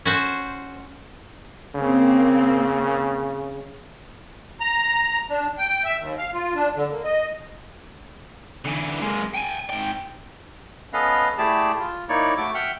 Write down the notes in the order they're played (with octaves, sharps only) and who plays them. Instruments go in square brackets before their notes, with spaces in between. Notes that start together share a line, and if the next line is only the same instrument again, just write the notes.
[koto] C#4 F#4 C5
[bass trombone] C#3 [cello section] A#3 C4
[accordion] A#5
D4
G5
E5
D#2
F5
F4
D4
D3
A#3
D#5
[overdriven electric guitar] D3 E3
G#3 A#3
G5 G#5
G#2 G5
[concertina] B3 C#4 A4 B4 D#5 F5
A3 E4 G4 G#4 D5 A5
F4
A#3 D#4 E4 C#5 D5
A3 F#4 A4 D6
E5 F#5 G5 F6